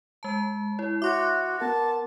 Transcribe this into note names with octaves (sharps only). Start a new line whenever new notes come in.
G#3 A5
E4 C#5
F#4 C#5 E5 C6 D6
B3 A#4 F#5 A5